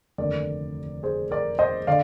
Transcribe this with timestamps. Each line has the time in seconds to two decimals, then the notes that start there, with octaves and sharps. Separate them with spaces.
0.18 F1 D#2 D3 A#4 D5
1.03 G#4 C5
1.31 A#4 D5
1.59 C5 D#5
1.87 D3 D5 F5